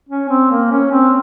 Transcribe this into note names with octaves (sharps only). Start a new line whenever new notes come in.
C#4
C4
A#3
C#4
C4